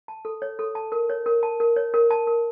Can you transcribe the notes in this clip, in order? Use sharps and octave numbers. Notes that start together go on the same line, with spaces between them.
A5
A4
C#5
A4
A5
A#4
C#5
A#4
A5
A#4
C#5
A#4
A5
A#4